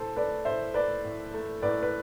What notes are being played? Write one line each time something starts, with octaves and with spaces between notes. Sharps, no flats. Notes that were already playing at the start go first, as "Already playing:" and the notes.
Already playing: A2 A4 C5
A3 B4 D5
A2 C5 E5
A3 B4 D5
A2
A3
A2 B4 D5
B4